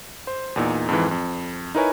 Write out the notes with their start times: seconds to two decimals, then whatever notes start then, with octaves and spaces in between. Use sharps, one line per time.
0.27 C5
0.56 E2 A#2 D#4
0.88 F2 G#2 E3
1.11 F2
1.75 D#4 E4 A#4 B4 C#5 G#5